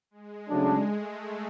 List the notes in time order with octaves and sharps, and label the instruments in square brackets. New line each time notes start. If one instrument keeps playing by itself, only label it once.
[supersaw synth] G#3
[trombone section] C#3 F#3 A3 D4
[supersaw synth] A3